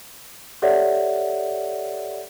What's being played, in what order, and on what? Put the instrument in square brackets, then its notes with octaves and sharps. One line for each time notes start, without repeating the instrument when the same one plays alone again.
[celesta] G4 A4 C#5 D5 E5 F#5